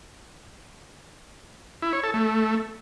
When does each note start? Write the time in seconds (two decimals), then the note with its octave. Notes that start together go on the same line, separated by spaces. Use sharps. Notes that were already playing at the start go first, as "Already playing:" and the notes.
1.82 E4
1.93 C#5
2.03 A4
2.14 A3